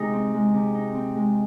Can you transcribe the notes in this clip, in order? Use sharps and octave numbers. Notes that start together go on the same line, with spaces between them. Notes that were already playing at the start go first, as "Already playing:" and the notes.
Already playing: C3 G#3 D#4
C4
G#3
C3
D#4
C4
G#3